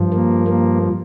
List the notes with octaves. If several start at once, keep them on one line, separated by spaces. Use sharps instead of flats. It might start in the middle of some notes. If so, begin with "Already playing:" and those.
Already playing: G2 F3
A#3
A#3